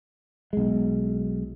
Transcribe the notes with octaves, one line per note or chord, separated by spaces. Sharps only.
B1 G#3